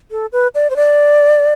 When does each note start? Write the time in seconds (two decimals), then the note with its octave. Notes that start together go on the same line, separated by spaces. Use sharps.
0.11 A4
0.32 B4
0.55 D5
0.70 C5
0.76 D5